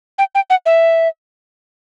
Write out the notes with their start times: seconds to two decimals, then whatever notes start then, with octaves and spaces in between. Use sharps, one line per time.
0.18 G5
0.35 G5
0.50 F#5
0.66 E5